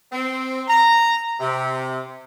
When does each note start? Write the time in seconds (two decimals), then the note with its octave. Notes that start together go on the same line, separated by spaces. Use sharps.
0.11 C4
0.68 A#5
1.40 C3